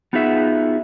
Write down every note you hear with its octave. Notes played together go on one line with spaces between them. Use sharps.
B3 D#4 F4 F#4 G#4 E5